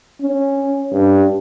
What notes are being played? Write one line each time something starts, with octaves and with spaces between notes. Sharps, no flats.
C#4
G2